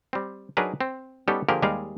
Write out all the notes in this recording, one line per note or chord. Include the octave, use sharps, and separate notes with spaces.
G3 C4
F#3 D4 D#4 G#4 A#4 B4
C4
G3 B3 C#4 D#4 G4 A4
D3 F3 A#3 G4 G#4 A#4
D#2 G3 G#3 G#4 A#4 F5